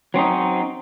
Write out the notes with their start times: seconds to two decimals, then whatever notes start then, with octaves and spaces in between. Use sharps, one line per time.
0.14 F#3 C4 C#4 D#4